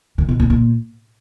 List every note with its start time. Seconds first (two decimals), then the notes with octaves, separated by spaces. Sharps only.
0.18 D#3
0.29 B2
0.40 A#2
0.50 A#2